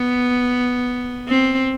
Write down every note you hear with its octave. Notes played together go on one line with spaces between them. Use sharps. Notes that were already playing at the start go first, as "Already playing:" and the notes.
Already playing: B3
C4